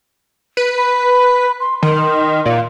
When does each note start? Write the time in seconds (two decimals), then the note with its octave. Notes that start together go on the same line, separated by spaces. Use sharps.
0.57 B4
0.78 B5
1.60 C6
1.82 D#3 C6
2.46 A#2 F5